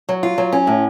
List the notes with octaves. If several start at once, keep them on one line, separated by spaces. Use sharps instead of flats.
F#3
F4
F#3
C#4
A2